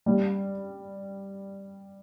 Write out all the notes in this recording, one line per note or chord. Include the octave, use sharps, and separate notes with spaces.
G3